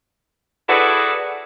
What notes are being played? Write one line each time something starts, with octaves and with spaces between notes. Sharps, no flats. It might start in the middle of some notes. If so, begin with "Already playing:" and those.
E4 F#4 G#4 A4 B4 D5